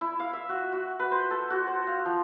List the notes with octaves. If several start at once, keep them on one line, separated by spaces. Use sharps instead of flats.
E4
F5
E5
F#4
F#4
B4
C5
A4
F#4
C5
F5
F3